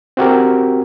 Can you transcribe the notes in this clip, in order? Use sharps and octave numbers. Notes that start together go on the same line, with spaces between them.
C4 F#4 G4 A#4